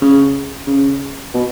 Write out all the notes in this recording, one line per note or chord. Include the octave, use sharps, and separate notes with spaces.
C#3
C#3
B2